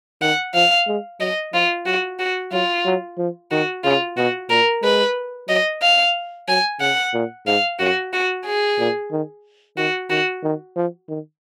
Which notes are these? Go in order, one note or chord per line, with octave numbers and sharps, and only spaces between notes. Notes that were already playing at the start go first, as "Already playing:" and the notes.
D#3 F#5
F3 F5
G#3
F#3 D#5
F3 F4
F#3 F#4
F#4
F#3 F4
F#3
F3
D#3 F#4
C#3 F4
B2 F#4
A#2 A#4
G#3 B4
F#3 D#5
F5
F#3 G#5
C#3 F#5
A#2
G#2 F5
F#2 F#4
F#4
G#4
A#2
D#3
D#3 F#4
D#3 F#4
D#3
F3
D#3